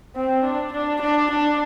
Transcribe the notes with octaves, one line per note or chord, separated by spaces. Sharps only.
C4
D4
D4
D4
D4